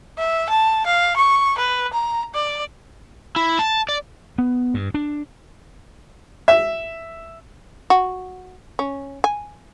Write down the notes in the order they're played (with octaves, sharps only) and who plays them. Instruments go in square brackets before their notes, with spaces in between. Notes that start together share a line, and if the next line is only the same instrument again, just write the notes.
[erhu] E5
A5
F5
C#6
B4
A#5
D5
[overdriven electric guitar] E4
A5
D5
[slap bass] B3
G2
D4
[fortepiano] E5
[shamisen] F#4
C#4
G#5